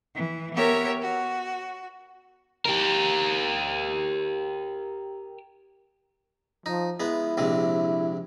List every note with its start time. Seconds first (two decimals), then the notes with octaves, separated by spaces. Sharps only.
0.15 E3
0.55 B3 G4 A#4 C#5 E5
1.02 F#4
2.65 G4 A#4
6.66 F3 D#4
7.00 G#3 B3 E4
7.37 A#1 C3 G#3